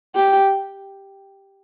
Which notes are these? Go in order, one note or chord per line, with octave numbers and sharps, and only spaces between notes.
G4